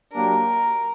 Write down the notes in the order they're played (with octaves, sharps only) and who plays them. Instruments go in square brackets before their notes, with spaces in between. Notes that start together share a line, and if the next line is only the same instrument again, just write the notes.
[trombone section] F#3 A#3 D4 G4 [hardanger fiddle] A#4